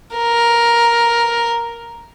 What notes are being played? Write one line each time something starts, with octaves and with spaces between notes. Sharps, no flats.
A#4